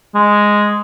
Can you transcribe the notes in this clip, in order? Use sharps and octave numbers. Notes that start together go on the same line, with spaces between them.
G#3